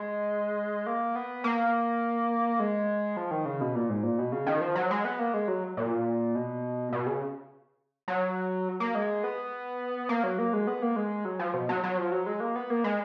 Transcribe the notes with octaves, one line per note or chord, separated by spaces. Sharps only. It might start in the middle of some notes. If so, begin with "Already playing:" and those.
Already playing: G#3
A#3
B3
A#3
G#3
F3
D#3
C#3
B2
A#2
G#2
A#2
B2
C#3
D#3
F3
F#3
G#3
B3
A#3
G#3
F#3
A#2
B2
B2
C#3
F#3
A#3
G#3
B3
A#3
F#3
A#3
G#3
B3
A#3
G#3
F#3
F3
B2
F#3
F#3
F3
F#3
G#3
A#3
B3
A#3
G#3